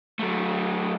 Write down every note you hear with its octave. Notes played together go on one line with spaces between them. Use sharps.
F#3 A3